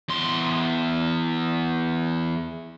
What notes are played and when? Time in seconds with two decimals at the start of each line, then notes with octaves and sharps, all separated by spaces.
0.09 E2 C6